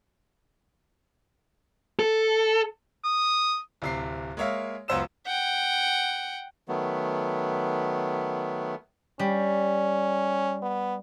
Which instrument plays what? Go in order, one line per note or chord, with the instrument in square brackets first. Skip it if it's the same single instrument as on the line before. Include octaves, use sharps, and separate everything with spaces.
[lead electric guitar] A4
[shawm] D#6
[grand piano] D1 C3 C7
G#3 A#3 C#5 E5 F5
C#2 F#2 B3 C5 E6 E7
[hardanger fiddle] F#5 G5
[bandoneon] D#3 F#3 A3 B3
[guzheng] G3 [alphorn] C#4
[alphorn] B3